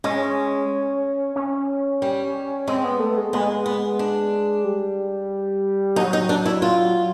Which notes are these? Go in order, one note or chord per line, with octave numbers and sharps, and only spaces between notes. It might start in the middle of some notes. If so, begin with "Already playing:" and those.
G#3 C#4
C#4
G3
G#3 C4
B3
A3
G#3
G#3 B3
B3
D4
G3
F#3 D#4
D#4
D4
E4
F4